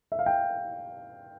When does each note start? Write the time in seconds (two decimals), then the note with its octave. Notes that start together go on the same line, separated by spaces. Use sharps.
0.12 E5
0.19 F5
0.26 G5